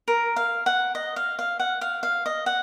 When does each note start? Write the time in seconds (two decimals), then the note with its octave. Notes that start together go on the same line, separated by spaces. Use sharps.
0.08 A#4
0.36 F5
0.66 F#5
0.95 D#5
1.16 F5
1.39 F5
1.59 F#5
1.81 F5
2.03 F5
2.26 D#5
2.46 F#5